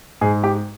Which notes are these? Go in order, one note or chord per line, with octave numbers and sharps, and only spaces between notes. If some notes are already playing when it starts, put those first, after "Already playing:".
G#2 G#4
G4